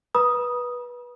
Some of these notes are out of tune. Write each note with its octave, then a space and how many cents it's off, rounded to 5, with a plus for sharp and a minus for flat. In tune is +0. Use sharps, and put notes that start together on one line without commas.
B4 -20 B5 -45 D#6 +0